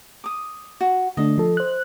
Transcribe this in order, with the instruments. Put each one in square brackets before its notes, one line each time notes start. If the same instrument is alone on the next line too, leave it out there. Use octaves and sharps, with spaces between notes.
[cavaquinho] D6 D#6
F#4
[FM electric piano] D3 A3 D4 [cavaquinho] D#5
[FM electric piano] F3 A4
C5 F#6